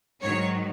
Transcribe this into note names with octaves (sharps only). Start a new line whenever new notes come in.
G#2 D#3 F#3 C#5